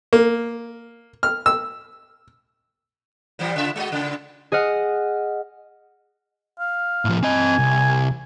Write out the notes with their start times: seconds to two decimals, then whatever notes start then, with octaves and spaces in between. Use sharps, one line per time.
0.13 A#3
1.23 F6
1.46 E6
3.39 A#2 E3 G3
3.56 C#3 F4 E5
3.76 G#3 F#4 D#5
3.92 A#2 C#3
4.52 G#4 D#5 F#5 F6
6.59 F5
7.05 A2 F3
7.23 C4 D#5 G#5
7.59 C2